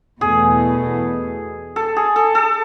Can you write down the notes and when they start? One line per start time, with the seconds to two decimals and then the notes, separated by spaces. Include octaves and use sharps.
0.21 E2 B2 A3 G#4
1.76 A4
1.96 G#4
2.16 A4
2.35 A4